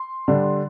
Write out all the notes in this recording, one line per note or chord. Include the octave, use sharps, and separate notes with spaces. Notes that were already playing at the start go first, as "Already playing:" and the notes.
Already playing: C6
D3 G3 D4